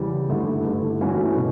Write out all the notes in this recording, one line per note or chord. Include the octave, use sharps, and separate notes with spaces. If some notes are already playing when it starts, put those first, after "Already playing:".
Already playing: E2 C#3 G3
G2 D3 A3 E4
G2 D3 A3 E4
G2 E3 A3 C#4 F#4
B2 A3